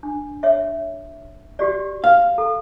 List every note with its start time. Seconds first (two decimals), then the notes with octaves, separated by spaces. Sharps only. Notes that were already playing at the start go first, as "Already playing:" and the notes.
0.03 D4
0.43 C#5 E5
1.59 F#4 G4 D5
2.04 F5
2.38 A4